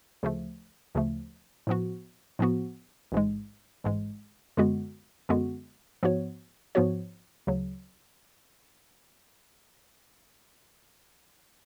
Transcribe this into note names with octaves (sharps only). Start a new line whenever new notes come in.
D2 C#3 F3 A3
D2 C#3 F3 A3
A2 F3 B3 F#4
A2 F3 B3 F#4
A1 G#2 G#3
A1 G#2 G#3
F#2 D3 G#3 B3 F#4
F#2 D3 G#3 B3 F#4
G#2 F3 B3 F#4 C#5
G#2 F3 B3 F#4 C#5
D2 C#3 F#3